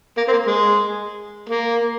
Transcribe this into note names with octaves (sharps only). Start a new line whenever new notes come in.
A#3
C4
A#3
G#3
A#3